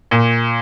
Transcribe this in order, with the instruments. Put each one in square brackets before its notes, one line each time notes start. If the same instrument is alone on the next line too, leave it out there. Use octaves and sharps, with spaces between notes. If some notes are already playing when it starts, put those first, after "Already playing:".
[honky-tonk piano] A#2